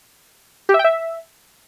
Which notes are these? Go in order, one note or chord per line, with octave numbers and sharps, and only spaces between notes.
G4
E5
G5
E5